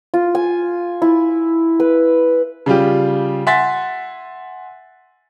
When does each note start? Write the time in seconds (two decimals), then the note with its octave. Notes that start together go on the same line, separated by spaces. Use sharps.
0.14 F4
0.35 G#5
1.02 E4
1.80 B4
2.66 C#3 G3 F4 G4
3.47 E5 F#5 G#5 C6 A6 B6